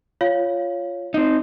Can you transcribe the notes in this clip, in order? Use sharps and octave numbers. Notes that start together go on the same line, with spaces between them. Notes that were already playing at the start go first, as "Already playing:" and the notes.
F4 C#5 F5
C4 D#4